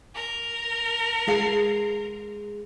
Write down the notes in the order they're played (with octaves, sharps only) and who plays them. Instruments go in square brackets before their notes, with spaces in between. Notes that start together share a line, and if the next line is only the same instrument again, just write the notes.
[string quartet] A#4
[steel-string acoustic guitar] G#3 G#4 F5